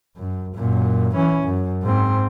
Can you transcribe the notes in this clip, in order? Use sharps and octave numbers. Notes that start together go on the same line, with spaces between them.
F#2
F#2 A#2
E3 C#4
F#2
G#2 C4